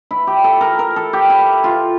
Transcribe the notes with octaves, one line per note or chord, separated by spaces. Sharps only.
E4
G4
A4
A#4
A#4
A4
G4
E4
F4